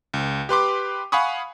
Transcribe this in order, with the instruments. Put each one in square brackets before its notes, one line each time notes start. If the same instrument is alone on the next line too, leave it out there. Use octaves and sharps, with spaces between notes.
[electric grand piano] C#2
G4 B4 C6 D6
F5 F#5 G#5 B5 C#6 D#6